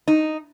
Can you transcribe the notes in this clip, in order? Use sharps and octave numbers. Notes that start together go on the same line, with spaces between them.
D#4